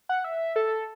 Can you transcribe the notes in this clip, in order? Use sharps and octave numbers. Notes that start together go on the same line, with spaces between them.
F#5
E5
A4